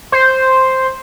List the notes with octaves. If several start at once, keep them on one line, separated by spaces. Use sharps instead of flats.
C5